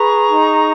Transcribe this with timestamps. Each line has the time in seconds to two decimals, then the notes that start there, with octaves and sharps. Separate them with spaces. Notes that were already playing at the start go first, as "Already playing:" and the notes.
Already playing: G#4 B4 A#5 C#6
0.29 D#4